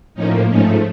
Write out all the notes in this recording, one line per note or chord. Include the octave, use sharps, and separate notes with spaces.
A2 F3 A#3 C#4 D#4
G#2 F3 A3 C#4 D#4